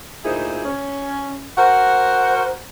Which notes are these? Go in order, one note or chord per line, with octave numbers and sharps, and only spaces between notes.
D2 A#2 D#4 E4 G#4 C5
C#4
F#4 A#4 C5 F#5